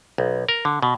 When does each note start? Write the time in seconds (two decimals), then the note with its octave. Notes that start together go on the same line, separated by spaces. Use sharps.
0.18 B1
0.49 A#4
0.65 D3
0.83 B2